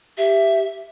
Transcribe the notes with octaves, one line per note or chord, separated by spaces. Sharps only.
G4 E5